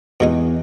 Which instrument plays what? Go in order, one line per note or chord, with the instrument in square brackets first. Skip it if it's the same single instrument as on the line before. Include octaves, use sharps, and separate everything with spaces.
[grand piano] E2 [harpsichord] B2 G#3 D#4